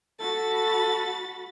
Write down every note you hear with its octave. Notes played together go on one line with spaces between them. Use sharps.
F#4 A4 B5 A6